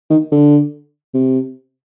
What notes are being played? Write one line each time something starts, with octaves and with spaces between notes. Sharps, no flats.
D#3
D3
C3